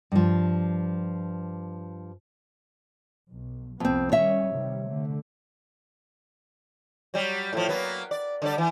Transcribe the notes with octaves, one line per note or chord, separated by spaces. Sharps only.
G2 F3
B1
C2 F2 B3 C4
D#3 G3 C#4 C#5 E5
C3 D#3 G3
D3 A3
F#3 G3
A2 F3
F#3 A#3 B3
D5
D3 G3 D5
E3